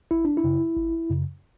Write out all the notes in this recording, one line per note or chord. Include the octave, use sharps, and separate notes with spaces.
G#1 E4
D4
E4
F#2 C#3
G#1
F#2 C#3